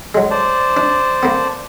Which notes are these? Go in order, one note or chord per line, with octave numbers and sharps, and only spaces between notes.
F#3 G#3
C5 D5 A5
D4
A#3 B3